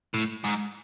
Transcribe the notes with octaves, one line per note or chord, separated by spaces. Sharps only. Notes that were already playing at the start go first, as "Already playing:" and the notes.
A2
G#2